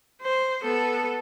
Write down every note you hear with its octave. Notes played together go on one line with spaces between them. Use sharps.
C5
B3 A4